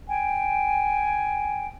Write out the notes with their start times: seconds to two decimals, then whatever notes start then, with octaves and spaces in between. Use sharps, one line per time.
0.09 G5 G#5